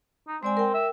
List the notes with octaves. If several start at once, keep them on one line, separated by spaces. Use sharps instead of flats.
D#4
G#3 C4 D5 G#5
A#4 G5
E5